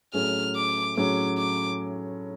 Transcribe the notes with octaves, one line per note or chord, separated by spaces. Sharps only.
A2 F#3 C#4 G#4 F6
D6
A2 F#3 C#4 G#4 D6
D6